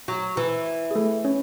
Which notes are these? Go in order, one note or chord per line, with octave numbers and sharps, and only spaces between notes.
F#3
E3
G#4
A3 A4
C#4 C#5